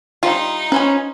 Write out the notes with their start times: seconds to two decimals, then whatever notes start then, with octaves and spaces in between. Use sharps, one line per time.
0.23 G3 D#4 F4
0.72 C#4 B4 C5 G#5